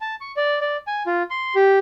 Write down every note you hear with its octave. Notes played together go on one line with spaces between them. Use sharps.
A5
C#6
D5
D5
G#5
F4
C6
G4